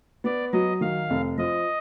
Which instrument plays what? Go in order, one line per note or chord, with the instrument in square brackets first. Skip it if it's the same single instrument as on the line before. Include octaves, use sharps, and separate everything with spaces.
[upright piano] B3 [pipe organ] D5
[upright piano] F#3 [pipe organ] D#5
[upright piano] D#3 [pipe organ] F5
[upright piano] F1
[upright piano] F3 [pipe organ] D#5